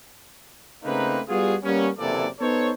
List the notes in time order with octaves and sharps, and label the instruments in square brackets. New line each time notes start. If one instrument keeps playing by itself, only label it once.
[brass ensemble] C#3 A3 A#3 C4 D#4 B4
G3 B3 F4 F#4 G#4
G3 A#3 B3 C#4
F#1 C3 E3 A#3 A4 D5
B3 D#4 A4 C5 C#5